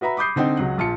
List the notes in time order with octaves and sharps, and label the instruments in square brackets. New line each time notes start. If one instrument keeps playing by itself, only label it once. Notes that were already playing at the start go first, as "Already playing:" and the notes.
[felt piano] F#4 B4 E5 A#5 B5
B5 D6 D#6 G6 C7
D3 C4 D#4 G5
C#2 F#3 F#5
A#1 F4 A5 C#7